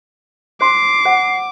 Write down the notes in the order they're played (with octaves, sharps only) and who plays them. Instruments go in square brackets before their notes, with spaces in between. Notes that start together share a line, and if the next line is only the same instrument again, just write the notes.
[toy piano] C5 C6 [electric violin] D6 [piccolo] C7
[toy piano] C5 F#5